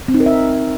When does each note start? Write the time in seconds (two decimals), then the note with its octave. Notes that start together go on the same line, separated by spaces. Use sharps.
0.08 C4
0.14 D#4
0.20 A#4
0.26 E5